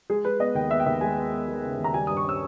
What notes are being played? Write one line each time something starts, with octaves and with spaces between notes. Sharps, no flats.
G#3 G#4
G#3 B4
B3 D#5
D#2 G5
B3 E5
G5
D#2 E5
G#3 G#5
B3
B3
G#3
C#3
D#2
A#5
G3 G#5
G2 D#6
C#6
C#4 E6